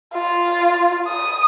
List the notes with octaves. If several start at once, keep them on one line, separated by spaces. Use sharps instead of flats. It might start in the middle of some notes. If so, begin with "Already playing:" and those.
F4
D#6